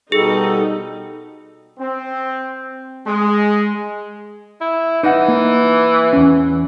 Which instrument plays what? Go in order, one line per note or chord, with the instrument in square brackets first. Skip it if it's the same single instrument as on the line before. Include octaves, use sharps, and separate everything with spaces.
[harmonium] B2 G3 A4 [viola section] D#4 [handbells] G#4
[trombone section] C4
G#3
[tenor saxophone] E4
[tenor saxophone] E3 [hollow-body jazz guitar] D#4 D#5 F#5
[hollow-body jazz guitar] A#3
E2 C#4